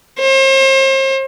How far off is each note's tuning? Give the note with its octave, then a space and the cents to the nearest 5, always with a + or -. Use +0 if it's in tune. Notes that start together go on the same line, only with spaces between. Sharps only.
C5 +40